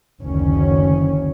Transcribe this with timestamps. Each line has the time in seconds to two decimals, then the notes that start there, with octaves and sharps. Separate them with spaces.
0.20 F#1 D2 D#3 C#4